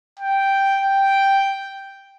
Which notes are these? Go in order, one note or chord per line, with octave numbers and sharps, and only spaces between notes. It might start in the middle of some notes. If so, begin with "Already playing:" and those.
G5
G5